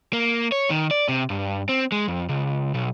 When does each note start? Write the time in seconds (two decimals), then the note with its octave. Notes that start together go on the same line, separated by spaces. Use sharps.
0.13 A#3
0.52 C#5
0.70 D#3
0.91 D5
1.09 C3
1.30 G2
1.69 C4
1.92 G#3
2.08 F2
2.29 C#2
2.75 B1